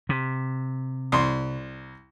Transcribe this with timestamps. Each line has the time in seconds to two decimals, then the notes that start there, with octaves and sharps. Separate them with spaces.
0.09 C3
1.12 C2 C6